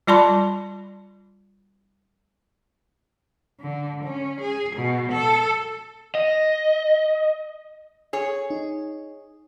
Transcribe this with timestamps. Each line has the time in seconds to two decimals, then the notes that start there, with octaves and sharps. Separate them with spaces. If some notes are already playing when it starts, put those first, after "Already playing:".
0.07 G3 F4 D5 A5 B5 C6
3.61 D3
4.04 C#4
4.41 G#4
4.76 B2
5.12 A4
6.15 D#5
8.13 G#4 C#5
8.50 D#4